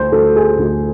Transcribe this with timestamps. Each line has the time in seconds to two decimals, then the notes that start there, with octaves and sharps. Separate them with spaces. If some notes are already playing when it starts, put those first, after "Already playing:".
Already playing: D2 C5
0.12 D2 A4
0.36 G#4
0.59 D2